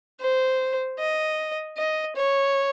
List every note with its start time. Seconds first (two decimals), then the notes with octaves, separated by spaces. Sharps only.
0.21 C5
0.99 D#5
1.77 D#5
2.16 C#5